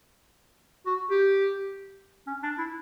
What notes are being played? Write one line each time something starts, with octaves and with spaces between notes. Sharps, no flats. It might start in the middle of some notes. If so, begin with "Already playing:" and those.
F#4
G4
C#4
D4
E4